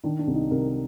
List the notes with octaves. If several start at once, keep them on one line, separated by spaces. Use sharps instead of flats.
D#3 D4
D4
C2
D#4
C2 A#4